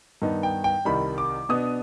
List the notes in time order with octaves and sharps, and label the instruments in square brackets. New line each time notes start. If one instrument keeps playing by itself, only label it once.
[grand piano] G2 D#3 B3 D#4
G5
G5
C2 C3 D#3 G3 B5
D6
B2 B3 D4 D#6